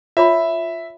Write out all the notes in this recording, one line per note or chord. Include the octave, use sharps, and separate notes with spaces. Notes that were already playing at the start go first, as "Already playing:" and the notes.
F4 C#5 E5 B5